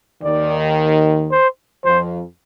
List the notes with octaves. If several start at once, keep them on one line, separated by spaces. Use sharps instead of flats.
D#2 D#3 D5
C5
F2 F3 C5